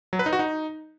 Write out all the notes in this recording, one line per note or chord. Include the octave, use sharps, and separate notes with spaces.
F#3
B4
D#4
F#4
D#4